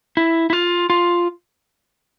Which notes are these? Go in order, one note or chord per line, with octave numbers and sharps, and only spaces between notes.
E4
E4
F4
F4